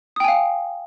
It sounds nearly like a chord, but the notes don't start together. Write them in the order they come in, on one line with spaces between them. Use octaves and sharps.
D#6 G5 G#5 F5